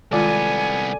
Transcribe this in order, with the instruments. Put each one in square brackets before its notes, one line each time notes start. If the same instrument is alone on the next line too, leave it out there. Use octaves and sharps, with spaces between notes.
[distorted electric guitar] C2 B3 [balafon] D#3 G#3 F4 [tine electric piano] A4 D5 [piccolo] G#5